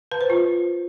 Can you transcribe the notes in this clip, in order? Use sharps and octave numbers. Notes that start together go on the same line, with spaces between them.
B4
C5
F4